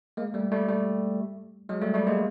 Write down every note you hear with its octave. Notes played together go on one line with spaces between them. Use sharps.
G#3 A#3
G3 A3
G3 A3
G3 A3
F#3 G#3
G3 A3
G3 A3
G#3 A#3